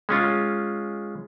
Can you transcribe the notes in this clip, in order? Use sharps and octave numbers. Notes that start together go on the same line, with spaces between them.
G#3 C#4 F4